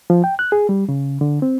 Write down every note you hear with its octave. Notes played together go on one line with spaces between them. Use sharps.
F3
G5
F#6
G#4
G3
C#3
D3
C4